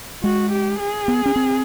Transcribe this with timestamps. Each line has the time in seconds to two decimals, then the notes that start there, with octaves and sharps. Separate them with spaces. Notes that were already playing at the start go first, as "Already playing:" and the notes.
0.24 G#3 F#4
0.52 G4
0.79 G#4
1.08 B3
1.26 C#4
1.36 C4